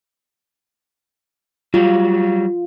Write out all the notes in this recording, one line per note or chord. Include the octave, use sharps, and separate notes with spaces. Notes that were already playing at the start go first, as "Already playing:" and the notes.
F#3 G3 F4